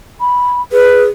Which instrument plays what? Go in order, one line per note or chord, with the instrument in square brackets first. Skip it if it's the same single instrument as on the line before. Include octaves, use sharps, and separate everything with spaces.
[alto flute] B5
[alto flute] G#4 [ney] B4